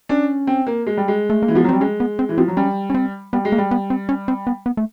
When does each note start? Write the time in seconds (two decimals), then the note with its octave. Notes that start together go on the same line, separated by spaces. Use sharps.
0.09 C#4 D4
0.47 C4
0.67 A#3
0.87 G#3
0.97 G3
1.08 G#3
1.30 A3
1.43 A#3
1.48 E3
1.55 F3 B3
1.64 F#3
1.69 G3 C4
1.81 G#3 C#4
2.00 B3
2.19 C4
2.29 E3
2.38 F3 C4
2.48 F#3
2.57 G3 C#4
2.90 C#4
2.95 C4
3.33 G3 B3
3.45 G#3
3.52 A#3
3.58 G3
3.71 B3
3.90 C4
4.09 C#4
4.28 C4
4.47 B3
4.66 B3
4.77 A3